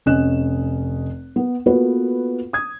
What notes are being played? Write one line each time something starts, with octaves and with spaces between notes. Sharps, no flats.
F1 C#4 D#5 F#6 E7
B3
A#3 B3 F4 F#4 A4 B4
D#6 G#6